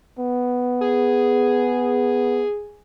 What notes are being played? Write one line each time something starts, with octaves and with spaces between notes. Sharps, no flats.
B3
G#4